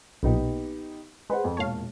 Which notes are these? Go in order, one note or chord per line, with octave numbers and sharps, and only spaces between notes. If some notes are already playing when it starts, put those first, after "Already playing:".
B1 A#2 B3 D#4 G4
G#3 B4 C5 F#5
F2
E1 A#2 C#5 F5 A5